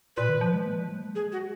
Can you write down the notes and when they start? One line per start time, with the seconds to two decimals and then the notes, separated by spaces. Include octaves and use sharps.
0.17 A#2 B4
0.29 D#3
0.41 F3
0.54 G#3
0.66 A#3
0.79 G#3
0.90 F#3
1.04 G#3
1.15 G#4
1.32 F#4